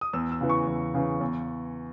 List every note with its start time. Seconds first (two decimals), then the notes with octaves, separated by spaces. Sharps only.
0.01 D#6
0.13 E2 E6
0.32 E6
0.41 C#3 E3
0.49 C#6
0.67 E2
0.94 C#3 E3
1.21 E2